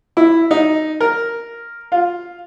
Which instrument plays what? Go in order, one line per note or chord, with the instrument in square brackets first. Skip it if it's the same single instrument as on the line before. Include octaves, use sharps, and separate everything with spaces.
[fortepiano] E4
D#4
A#4
F4